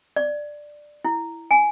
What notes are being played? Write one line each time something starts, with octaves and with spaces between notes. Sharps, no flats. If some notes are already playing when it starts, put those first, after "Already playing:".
D5
E4
G#5